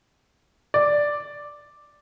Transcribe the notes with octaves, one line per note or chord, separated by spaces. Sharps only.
D5